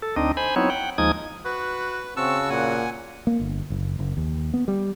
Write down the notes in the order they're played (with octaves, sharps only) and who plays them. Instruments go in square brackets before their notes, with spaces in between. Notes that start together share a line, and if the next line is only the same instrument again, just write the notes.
[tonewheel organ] A4
D2 C4 D4 D#4 D#5
C5 G#5 B5
F#3 B3 C4 D#4 E4 C#5
F#5 G5
D#2 F3 G#3 D#4 D#6 G#6
[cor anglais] F#4 [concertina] B4
[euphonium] C#3 [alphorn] C4 [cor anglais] F#4 [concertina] A5 C#6 E6
[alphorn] A#2 [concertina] F#5 G#5
[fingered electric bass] A#3
G1
F#1
F#1
D#2
B3
G3